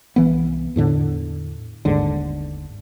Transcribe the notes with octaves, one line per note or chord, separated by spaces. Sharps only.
C2 E3 B3
E2 A2 D3 D4
G1 D#2 G#2 D3